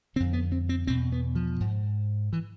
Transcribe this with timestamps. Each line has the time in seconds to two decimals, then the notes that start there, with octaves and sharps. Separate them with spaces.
0.16 D3 C4
0.20 F2
0.33 B3
0.52 C4
0.69 C4
0.87 E2 B2 C4
1.12 B3
1.35 F3
1.60 G#2
2.33 E3